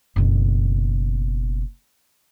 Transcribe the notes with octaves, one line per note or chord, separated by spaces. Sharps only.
F#1 B2